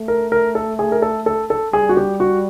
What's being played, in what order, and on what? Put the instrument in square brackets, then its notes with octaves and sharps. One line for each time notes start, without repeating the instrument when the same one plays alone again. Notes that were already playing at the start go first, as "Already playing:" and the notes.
Already playing: [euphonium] A3
[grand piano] A#4
A#4
A4
G#4
A#4
A4
A4
A4
[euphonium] G3 [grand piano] G#4
[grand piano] F#4
G4
F#4